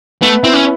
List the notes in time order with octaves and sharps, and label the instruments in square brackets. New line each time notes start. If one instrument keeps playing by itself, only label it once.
[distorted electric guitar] A3 [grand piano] B3
[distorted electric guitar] C4 [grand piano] E4
[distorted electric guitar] C#4